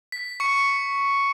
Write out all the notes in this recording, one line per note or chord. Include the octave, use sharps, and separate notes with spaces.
B6
C#6 C#7